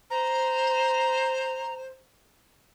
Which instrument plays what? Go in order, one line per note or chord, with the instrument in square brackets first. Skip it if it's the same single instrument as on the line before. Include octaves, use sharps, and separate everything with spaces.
[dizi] C5 [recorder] A#5